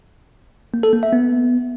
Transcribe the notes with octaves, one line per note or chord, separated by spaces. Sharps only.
A#3
A4
A#3
E5
B3